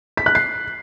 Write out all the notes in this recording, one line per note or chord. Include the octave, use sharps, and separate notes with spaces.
B6
F#6
C7